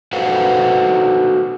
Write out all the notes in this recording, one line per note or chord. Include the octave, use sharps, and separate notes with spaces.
F#4 A4 B4 C5 F5 F#5